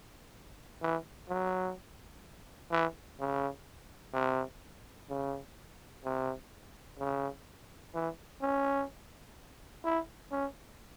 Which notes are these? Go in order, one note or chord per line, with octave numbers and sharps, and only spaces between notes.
E3
F#3
E3
C#3
C3
C#3
C3
C#3
E3
C#4
E4
C#4